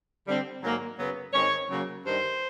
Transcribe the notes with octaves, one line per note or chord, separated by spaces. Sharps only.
D3 G3 C4
G#2 D#3 F#3 A#3
F#2 C#3 F#3 B3
G#2 D#3 G#3 C4 C#5
C#3 F#3 A#3
G2 D#3 G3 C5